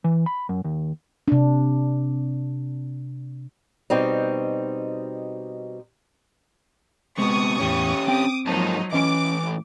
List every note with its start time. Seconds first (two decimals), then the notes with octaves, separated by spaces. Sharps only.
0.04 E3
0.26 B5
0.49 F#2
0.64 D#2
1.28 C3 D4
3.90 B2 G3 C4 D#4
7.18 C3 G#3 B3 C#6 D#6
7.60 E2 A2 C#4 G4
8.08 C4 G5 D6 D#6
8.47 G#2 F3 F#3 A#3 D#4 A5
8.93 A2 E3 C#4 D#5 D6